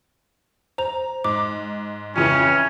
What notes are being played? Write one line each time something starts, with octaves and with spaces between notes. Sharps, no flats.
C5 A#5 F7
G#2 D6
F2 C#3 E3 C#4